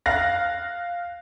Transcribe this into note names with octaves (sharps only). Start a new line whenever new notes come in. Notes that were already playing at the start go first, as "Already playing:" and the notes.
F5 F#6 A#6